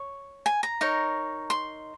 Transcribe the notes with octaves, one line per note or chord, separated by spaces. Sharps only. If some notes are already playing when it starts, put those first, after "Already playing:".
Already playing: C#5
G#5
A#5
D#4 A#4 C#5
C6